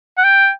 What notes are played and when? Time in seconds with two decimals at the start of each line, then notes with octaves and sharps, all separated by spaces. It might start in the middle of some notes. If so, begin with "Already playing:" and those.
0.18 F#5
0.24 G5